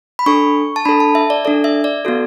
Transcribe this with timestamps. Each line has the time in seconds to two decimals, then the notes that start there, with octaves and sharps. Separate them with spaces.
0.19 B5
0.26 D4 A4 C#6
0.76 A5
0.85 D4 A4 B5
1.00 A5
1.15 E5
1.30 D5
1.45 D4 A4 D5
1.64 E5
1.84 D5
2.05 B3 F#4 A4